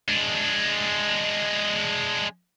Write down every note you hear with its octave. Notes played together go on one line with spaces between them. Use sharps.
G#3 D4